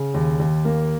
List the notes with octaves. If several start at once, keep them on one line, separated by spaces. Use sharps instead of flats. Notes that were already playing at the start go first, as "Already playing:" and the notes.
Already playing: C#3
D#2
D#2
A#3